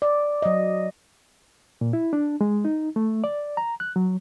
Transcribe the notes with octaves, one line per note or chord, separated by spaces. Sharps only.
D5
F#3 D#5
A#2
E4
D4
G#3
D#4
A3
D5
A#5
F#6
F#3